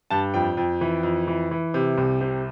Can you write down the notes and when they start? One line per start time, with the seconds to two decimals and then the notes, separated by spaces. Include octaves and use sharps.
0.10 G2 A5
0.34 F2 G5
0.57 F2
0.81 E3
1.03 F2
1.27 E3
1.51 E3
1.74 C3
1.98 C2
2.21 C3